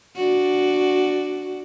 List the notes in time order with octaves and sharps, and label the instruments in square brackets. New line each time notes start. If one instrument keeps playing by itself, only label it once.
[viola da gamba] D4 F#4